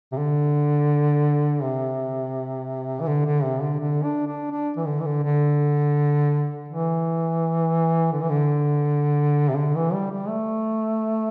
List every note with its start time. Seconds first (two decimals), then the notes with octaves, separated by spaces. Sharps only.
0.12 C3
0.18 D3
1.63 C3
3.00 E3
3.07 D3
3.25 D3
3.44 C3
3.62 D3
3.80 D3
4.04 D4
4.28 D4
4.51 D4
4.77 E3
4.87 D3
5.00 E3
5.06 D3
5.23 D3
6.68 E3
8.12 D3
8.21 E3
8.29 D3
9.49 C3
9.57 D3
9.75 E3
9.93 G3
10.11 G3
10.29 A3